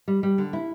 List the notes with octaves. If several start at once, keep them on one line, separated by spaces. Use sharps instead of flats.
G3
G3
D3
E4